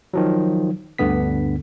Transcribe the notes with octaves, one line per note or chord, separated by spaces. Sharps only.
D#3 F3 F#3
D2 G2 D3 B3 B6